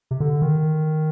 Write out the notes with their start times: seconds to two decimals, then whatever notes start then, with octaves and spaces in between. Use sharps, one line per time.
0.11 C3
0.20 D3
0.42 D#3